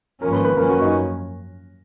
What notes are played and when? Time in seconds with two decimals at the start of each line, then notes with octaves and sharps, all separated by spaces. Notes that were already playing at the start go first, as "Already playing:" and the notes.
0.21 G#1 G#2 F3 A#3 C#4 A#4
0.33 B4
0.44 B4
0.57 F#2 F3 A#3 C#4 A#4
0.69 F#4
0.81 D#4